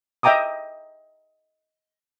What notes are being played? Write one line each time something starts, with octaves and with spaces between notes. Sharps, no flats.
D#5 E5 G5 A#5 D6 D#6